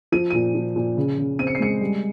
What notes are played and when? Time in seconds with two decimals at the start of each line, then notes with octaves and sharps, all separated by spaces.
0.12 F3 D#7
0.30 A#2 D#7
0.55 F3
0.76 A#2
0.97 C#3
1.18 C#3
1.39 C4 D#7
1.47 C#7
1.55 C7
1.60 G#3 C#7
1.81 G3